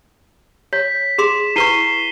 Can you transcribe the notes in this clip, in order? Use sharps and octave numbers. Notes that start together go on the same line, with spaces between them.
C#5 B6
G#4 C6 D6 E7
E4 B4 C#6 C7 D#7 G7